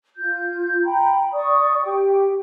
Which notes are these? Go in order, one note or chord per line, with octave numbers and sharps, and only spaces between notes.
F4 G6
G5 A#5 B5
D5 C#6 D#6
G4 G5